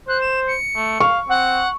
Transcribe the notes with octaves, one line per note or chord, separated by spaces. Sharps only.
C5 F#6
E7
C#7
A3
F5 C#6
C4 F#5